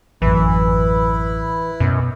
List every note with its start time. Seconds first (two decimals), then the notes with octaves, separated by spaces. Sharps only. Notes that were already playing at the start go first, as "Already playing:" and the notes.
0.22 A1 F#2 E3 E4 B4
1.80 F#2 B2